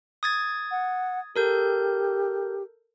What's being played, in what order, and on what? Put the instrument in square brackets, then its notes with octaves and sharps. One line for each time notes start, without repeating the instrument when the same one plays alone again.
[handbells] D#6 G#6 A6
[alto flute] F#5
[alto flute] G4 [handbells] A4 A#4 G6